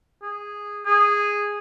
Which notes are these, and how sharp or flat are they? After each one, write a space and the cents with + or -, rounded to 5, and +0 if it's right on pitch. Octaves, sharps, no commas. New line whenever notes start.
G#4 -10
G#4 -10